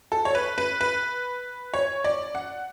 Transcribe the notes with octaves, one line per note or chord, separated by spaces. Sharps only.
A4
C#5
B4
B4
B4
C#5
D5
F#5